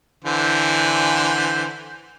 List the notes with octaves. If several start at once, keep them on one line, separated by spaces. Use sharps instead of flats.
D3 E3 C5